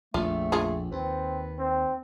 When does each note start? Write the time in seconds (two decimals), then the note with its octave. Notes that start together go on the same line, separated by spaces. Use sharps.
0.14 A#1 F2 A3 F4
0.52 F4 G#4
0.92 D#2 C4 B4
1.59 C4